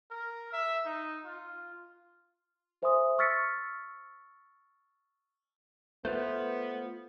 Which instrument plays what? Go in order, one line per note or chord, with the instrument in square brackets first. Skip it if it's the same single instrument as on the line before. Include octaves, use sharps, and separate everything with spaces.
[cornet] A#4
E5
D#4
F4
[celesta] A4 C5 E5 G#5 C6 D#6
C#6 E6 F6 A6 B6 C#7
[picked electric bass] A3 [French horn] B3 [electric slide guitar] F4 B4 C5